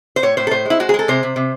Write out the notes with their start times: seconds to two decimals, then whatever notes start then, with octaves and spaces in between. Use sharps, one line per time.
0.16 C5
0.23 A2 C#5
0.37 A2 C5
0.47 A4
0.51 A2 C5
0.66 G#3 E4
0.80 G#3 F#4
0.89 G#4
0.94 G#3
0.99 A4
1.08 C3 C5
1.23 C3
1.36 C3